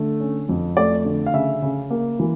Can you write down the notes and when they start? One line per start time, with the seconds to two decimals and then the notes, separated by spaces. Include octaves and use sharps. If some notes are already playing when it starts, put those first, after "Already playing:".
Already playing: D3 A3
0.20 C#4
0.49 F2
0.77 A3 D5
1.05 D3
1.26 F5
1.34 C#3 E5
1.62 C#3
1.91 A#3
2.20 E3